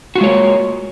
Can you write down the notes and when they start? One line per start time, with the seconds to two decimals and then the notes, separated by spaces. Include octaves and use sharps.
0.16 F#4
0.18 F4
0.21 G#3
0.24 C#5
0.26 A#3